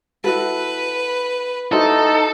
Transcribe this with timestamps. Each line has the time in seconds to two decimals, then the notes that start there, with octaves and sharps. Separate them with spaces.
0.24 E4 F#4 A4 B4
1.72 D#4 E4 F#4 A4 C5